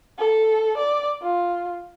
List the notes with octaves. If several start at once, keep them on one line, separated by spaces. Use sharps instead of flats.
A4
D5
F4